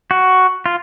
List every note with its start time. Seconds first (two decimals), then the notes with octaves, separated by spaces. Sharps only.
0.11 F#4
0.66 F4